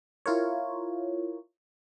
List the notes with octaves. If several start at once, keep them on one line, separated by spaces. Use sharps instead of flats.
E4 F4 A#4 C#5